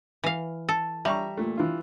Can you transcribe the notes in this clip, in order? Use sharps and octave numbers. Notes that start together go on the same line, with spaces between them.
E3 F5
A4
G3 E5 A#5 C#6
A#2 A3
E3 F4